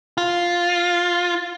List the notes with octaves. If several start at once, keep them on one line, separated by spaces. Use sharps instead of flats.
F4